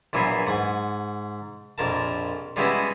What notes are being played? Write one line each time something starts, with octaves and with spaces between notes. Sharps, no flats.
A#1 E3 F#3 B3 G#5 C6
G#2 F#5 C#6
A#1 F2 A#4 A5
G3 G#3 B3 C#4 E4 F#4